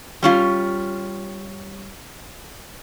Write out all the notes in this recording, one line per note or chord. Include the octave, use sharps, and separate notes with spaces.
G3 C#4 F4